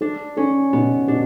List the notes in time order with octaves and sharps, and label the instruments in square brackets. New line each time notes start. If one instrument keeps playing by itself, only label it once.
[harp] D4 [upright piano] A4
[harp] C#4 [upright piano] A4
[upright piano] B2 [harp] B3
[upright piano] B2 [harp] D4